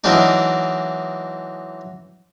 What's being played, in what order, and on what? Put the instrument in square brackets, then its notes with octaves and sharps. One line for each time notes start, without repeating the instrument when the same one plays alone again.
[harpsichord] E3 F#3 G#3 A#3 D4 D#4